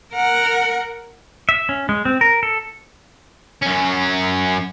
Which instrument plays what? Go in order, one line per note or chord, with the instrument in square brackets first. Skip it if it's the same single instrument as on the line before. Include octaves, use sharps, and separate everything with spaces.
[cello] A#4 F#5
[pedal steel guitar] E5
C#4
G#3
C4
A#4
A4
[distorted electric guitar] F#2 C#4